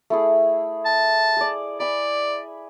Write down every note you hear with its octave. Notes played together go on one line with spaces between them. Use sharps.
A3 E4 G#4
A5
G#4 D5
D5 G#5 B5